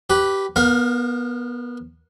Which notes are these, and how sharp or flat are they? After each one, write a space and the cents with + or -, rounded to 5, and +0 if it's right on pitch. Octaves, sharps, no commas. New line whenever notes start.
G4 -10 B4 +0
B3 -20 A#4 +0 F5 +25